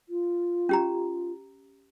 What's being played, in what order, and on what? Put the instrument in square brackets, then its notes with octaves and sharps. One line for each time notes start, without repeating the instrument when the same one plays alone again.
[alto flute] F4
[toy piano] C#4 G4 A#5